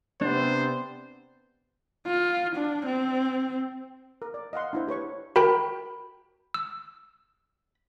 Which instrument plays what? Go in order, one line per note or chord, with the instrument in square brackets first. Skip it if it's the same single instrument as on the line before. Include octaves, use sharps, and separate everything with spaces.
[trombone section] C3 B3 [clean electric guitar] D4 [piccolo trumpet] C5
[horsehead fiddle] F4
D4
C4
[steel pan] A#4
D5
D#5 F5 F#5 C6
D4 E4 C5
G4 B4 C#5 C#6
[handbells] F#4 A#4 G5 [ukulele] B5
[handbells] E6